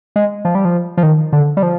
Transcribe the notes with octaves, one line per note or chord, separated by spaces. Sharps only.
G#3
F3
G3
F3
F3
D#3
D3
G3
F3